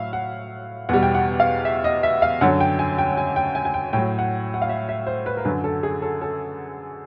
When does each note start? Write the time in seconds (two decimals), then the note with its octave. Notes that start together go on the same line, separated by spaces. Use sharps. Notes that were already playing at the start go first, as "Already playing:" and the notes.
Already playing: A2 F#3 E5 F5
0.13 F#5
0.89 E2 B2 G3 F#5
1.03 G5
1.14 F#5
1.40 F5
1.65 E5
1.84 D#5
2.03 E5
2.22 F5
2.41 F#2 D3 F#3 F#5
2.60 G5
2.79 G#5
2.98 G5
3.17 G#5
3.36 G5
3.55 G#5
3.65 G#5
3.74 G5
3.93 A2 F#3 G5
4.19 F#5
4.54 F#5
4.62 F5
4.69 E5
4.89 E5
5.07 C5
5.26 B4
5.37 A#4
5.45 F#2 D3 F#3 B4
5.64 A4
5.83 G#4
6.02 A4
6.22 A4